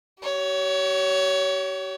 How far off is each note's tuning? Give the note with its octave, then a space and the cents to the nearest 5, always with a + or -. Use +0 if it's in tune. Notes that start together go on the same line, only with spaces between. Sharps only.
G4 -45 C#5 +20